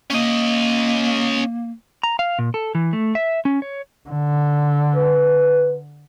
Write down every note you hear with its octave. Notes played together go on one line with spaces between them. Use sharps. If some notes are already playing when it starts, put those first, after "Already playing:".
A#3 C#4 D#5
A#5
F5
A#2
A4
E3
A3
E5
C#4
C#5
D3
B4